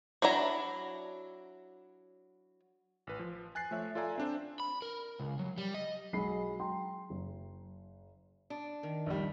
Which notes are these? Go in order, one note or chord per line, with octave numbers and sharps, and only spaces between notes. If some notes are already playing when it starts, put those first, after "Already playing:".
F#3 D4 E4 A#5
A1 B4
F3
G#5 F#6 A6 C7
F3 A3 C#5 E5
F4 A4 D5 E5 G#5 A#5
C4 D4 C5
B5
A#4
C#2
F#3
G3
D#5
B1 F#3 G#3 B5 C7
G5 A#5 C6
F#1
D4
D#3
A#1 D#2 G3